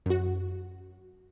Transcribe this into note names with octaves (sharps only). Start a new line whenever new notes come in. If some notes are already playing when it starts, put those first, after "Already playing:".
F#2 F#4